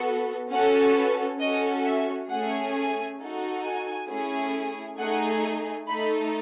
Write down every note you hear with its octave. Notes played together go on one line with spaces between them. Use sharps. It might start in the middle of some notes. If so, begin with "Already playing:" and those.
Already playing: B3 F#4 A4
C#4 F#4 A4 F#5
B4
C#4 F#4 A4 D#5
E5
A3 C#4 G#4 F#5
G#5
D#4 F#4 A4
G#5
A3 C#4 E4 G#4
A3 D#4 G#4 F#5
A3 D#4 A4 B5